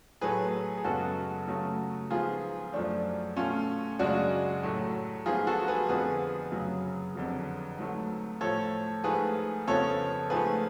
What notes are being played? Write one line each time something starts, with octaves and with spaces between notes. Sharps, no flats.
A2 F#3 A3 G#4 B4
G#4
F#2 C#3 G#3 B3 F#4 A4
C#3 F#3 A3
G#2 F3 B3 F4 G#4
F#2 F3 A3 D4
B2 A3 C#4 F4
F#2 C#3 G#3 D4 F#4
A2 F#3 A3
G#2 F3 B3 F4 G#4
F#4 A4
G#4 B4
F2 D3 F3 B3 G#4 B4
F#2 C#3 F#3
F2 D3 F#3
G#2 F#3 A3
A2 F3 A3 A4 C#5
G#2 F3 A3 G#4 B4
F2 C#3 F3 B3 A4 C#5
G#2 F3 A3 G#4 B4